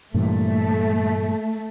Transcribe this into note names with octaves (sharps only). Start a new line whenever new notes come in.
G2 A#2 E3 A3